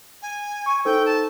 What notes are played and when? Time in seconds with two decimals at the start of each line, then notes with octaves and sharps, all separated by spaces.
0.22 G#5
0.66 C#6
0.85 D#4 A4 C5 G5
1.06 A5